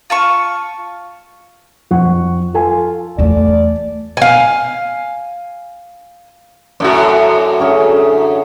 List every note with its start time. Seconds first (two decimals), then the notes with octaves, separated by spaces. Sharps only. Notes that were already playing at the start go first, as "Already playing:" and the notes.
0.10 F4 A5 C#6
1.91 F2 F#5 C#6
2.54 F4 A4 G#5
3.19 E2 A3 D5
4.17 F5 G#5
6.80 F#2 A2 F#4 A4 D5
7.60 D3 C#4 G#4